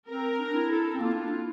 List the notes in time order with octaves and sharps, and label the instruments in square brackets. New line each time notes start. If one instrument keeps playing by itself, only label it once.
[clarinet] C4 [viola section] A#4
[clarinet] D4
E4
[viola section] A4
[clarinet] C4
[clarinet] A#3 [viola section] F4
[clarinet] D4
E4